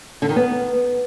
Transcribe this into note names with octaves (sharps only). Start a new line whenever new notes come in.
D3
D#3
B3